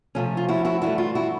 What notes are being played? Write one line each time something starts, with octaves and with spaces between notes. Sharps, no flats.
C3 F3 A3 C#4
F4
E4 F#4
E4 F#4
G2 E3 A3 E4 F#4
F4
E4 F#4